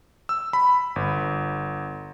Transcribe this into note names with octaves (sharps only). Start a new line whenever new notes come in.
E6
B5
G1